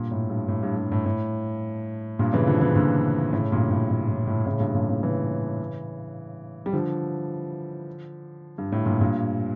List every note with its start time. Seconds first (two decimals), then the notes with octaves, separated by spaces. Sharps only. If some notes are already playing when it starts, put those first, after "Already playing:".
Already playing: G2 A#2
0.11 A2
0.30 G2
0.48 A2
0.63 G2
0.77 G2
0.92 A2
1.06 A2
2.19 G2 A#2
2.33 C#3 E3
2.47 D3 F3
2.61 C#3 E3
2.76 A#2 D3
3.33 A2 C#3
3.52 G2 A#2
3.70 A2
3.90 A2
4.08 A2
4.27 A2
4.46 A2 C#3
4.60 G2 A#2
4.75 G2 A#2
4.88 A2 C#3
5.03 C#3 E3
6.66 G3
6.73 D3 F3
8.58 G2
8.72 A2
8.86 G2 A#2
9.01 G2 A#2